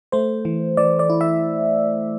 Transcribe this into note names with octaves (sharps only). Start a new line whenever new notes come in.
A3 C5
E3
E3 D5
D5
E4
E5